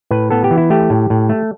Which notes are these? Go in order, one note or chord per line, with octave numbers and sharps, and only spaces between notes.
A2 B4
B3 A4
G4
E3
E4
A3 G4
A2
A2
A3